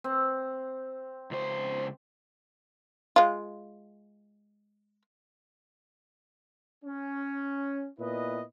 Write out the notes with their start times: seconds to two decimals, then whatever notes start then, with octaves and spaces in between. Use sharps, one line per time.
0.04 C4
1.31 C#2 C5
3.16 G#3 F4
6.85 C#4
7.99 A#2 B3 E4 B4 D#5